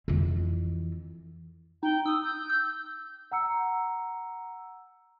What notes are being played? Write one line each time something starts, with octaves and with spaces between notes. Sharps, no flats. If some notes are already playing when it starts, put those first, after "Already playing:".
F2 E3
D#4 G5
D#6 E6
G6
E6
F#5 A#5 E6 C#7